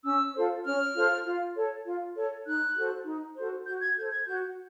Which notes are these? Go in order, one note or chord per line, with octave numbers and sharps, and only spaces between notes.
C#4 E6
F4 A4 C5
C#4 F6
F4 A4 C5
F4
A4 C#5
F4
A4 C#5
D#4 F#6
F#4 A4 C5
D#4
F#4 A4 C5
F#4 G6
G#6
A4 C5 G6
G#6
F#4 G6